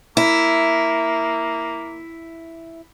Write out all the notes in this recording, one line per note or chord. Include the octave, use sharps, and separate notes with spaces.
A#3 E4